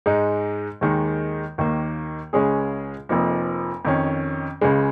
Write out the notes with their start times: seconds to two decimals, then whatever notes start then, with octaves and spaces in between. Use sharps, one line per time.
0.06 G#2 G#3 D#4
0.81 D#2 D#3 G#3 D#4
1.58 D#2 D#3 A#3
2.33 C#2 C#3 G#3 C#4 G#4
3.09 F1 F2 F3 A#3 D#4
3.85 F2 D#3 C#4
4.61 C#2 C#3 G#3